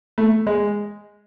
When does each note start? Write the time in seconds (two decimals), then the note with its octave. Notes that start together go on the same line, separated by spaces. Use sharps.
0.18 A3
0.47 G#3